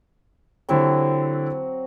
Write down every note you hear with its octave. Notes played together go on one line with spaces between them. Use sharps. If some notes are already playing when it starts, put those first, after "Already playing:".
D3 F#3 C4 E4 G4